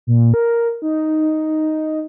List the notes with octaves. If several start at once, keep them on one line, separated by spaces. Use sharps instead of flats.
A#2
A#4
D#4